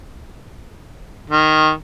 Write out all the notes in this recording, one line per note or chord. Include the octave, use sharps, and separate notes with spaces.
D#3